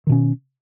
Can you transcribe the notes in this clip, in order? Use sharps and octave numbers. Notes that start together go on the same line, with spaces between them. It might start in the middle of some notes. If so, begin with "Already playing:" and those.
B2 D#3 C#4